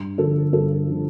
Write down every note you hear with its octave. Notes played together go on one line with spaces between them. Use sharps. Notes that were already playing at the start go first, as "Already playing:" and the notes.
Already playing: G2
D3 F3 A4
G2 A4
D3 F3